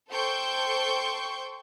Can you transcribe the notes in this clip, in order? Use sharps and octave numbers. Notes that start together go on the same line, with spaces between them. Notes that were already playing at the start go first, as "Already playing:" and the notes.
A4 C5 G5 C6 C#6 G6